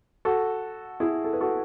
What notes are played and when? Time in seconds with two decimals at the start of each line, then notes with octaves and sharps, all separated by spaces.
0.25 F#4 A4
1.00 E4 G#4
1.24 A4
1.33 B4
1.41 F#4 A4